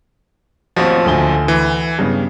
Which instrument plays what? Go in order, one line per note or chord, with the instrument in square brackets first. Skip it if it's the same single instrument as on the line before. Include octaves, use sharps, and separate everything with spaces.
[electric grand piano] A1 D#2 F3 [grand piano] C4 F4 F#4
[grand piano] D2 G#5 G7
[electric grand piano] E3
[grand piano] G2 B3 [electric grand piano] C#3